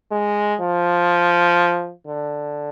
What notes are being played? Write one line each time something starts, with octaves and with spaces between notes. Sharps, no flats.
G#3
F3
D3